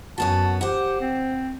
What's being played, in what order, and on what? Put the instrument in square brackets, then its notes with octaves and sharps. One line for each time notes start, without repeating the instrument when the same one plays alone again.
[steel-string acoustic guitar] F#2 B3 F#4 [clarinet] A5
[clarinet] G4 [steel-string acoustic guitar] C5 F#5
[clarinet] C4